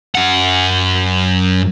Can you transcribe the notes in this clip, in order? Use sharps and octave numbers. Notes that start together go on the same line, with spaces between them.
F#2 F#5